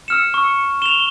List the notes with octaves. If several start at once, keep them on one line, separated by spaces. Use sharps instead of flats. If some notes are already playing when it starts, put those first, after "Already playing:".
E6 F6 C#7 E7
C#6 E6
E7 F7 G7